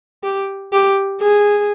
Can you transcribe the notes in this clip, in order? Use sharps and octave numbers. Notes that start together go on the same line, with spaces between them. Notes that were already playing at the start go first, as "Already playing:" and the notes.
G4
G4
G#4